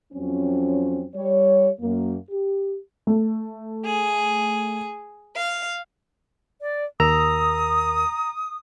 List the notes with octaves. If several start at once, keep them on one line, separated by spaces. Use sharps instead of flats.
F2 F#3 C4 C#4
G3 C#5
F#2 A#3
G4
A3
G#4
F5
D5
D#2 A#4 A#5 D#6 E6